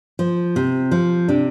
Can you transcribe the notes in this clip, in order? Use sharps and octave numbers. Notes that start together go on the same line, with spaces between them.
F3
C3
F3
C3 D4